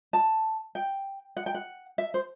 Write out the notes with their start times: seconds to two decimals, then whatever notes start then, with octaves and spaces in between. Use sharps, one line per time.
0.13 A5
0.75 G5
1.37 F#5
1.46 G5
1.55 F#5
1.98 E5
2.14 C5